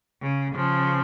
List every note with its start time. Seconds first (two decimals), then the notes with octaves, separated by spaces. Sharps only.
0.22 C#3
0.55 C#3 F3